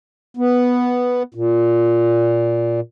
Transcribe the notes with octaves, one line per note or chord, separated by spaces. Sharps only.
B3
A#2